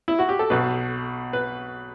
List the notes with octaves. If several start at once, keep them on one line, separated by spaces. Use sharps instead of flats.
E4
F#4
G4
A4
B1 B2 B4
B4